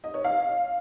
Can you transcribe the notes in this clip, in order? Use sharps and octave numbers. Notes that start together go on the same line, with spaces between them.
D#5
C#5
F5